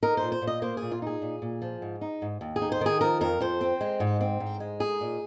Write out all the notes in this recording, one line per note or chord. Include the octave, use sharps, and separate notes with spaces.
D#4 A#4
A#2 C5
C5
A#2
D#5
A#3 C5
G#4
A#2
F4
D#4 G#4
A#2
A#2
F3
G#2
D#4
G#2
D#2
G#4
D#4
C5
D#3 G#4
F3 A#4
F2 A#4
F2 C5
C4
G#3
G#2
C4
G#2
G#3
D#4 G#4
A#2